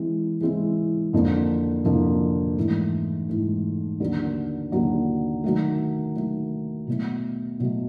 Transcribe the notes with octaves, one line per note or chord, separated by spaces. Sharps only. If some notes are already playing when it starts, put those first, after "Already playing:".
Already playing: E3 G#3 C4 E4
E3 G#3 C4 E4
F2 D3 F3 A#3
F2 D3 F3 A#3
G#2 E3 A3
G#2 E3 A3
D#2 D3 F#3
D#2 D3 F#3
D#3 F#3 A3
D#3 F#3 A3
B2 F#3 A3
B2 F#3 A3